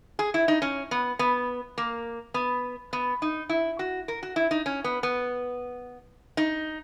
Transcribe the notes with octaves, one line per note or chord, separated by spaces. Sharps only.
G#4
E4
D#4
C#4
B3
B3
A#3
B3
B3
D#4
E4
F#4
A#4
F#4
E4
D#4
C#4
B3
B3
D#4